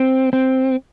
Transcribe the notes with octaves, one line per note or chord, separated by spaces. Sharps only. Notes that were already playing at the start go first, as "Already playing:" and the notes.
Already playing: C4
C4